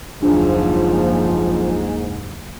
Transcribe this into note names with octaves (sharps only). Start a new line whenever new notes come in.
F#1 D#2 G#2 F3 D4